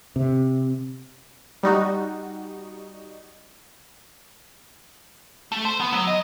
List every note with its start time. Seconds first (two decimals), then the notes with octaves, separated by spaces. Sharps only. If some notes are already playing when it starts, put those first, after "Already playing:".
0.16 C3
1.63 G3 D#4 F#4
5.52 A3
5.65 C5
5.80 B3
5.93 F#3
6.07 D#5